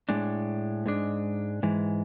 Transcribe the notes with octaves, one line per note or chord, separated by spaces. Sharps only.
A2 G#3 D4
G#2 G#3 D4
G#2 E3 G#3